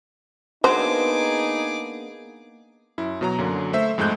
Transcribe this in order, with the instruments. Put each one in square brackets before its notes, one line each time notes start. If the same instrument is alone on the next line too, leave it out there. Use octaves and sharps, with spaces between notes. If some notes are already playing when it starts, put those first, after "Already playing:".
[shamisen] F#3 C5 [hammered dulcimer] A#3 B3 D4 [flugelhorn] D#4 [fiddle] G#4 D6
[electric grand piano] F#2 E4
B2 F#3 A#5
F#2 D3 F#3 A#3
A3 C5 E5
F2 G#2 G#3 A3 F#6 G6